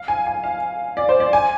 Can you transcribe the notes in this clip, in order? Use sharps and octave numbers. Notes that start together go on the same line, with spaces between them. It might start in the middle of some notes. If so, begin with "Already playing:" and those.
Already playing: F5
G#5
G#5
F5
D5
C5
D5
G#5